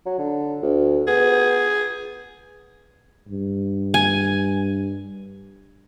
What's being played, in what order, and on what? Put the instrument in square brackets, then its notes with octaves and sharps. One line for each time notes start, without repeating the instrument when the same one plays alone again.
[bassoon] F#3
D3
D2
[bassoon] B3 [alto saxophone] G#4
[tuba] G2
[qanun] G#5